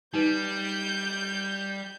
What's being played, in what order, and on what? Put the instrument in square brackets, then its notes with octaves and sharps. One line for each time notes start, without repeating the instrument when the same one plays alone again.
[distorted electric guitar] G3 [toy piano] D#4 B4 [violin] G6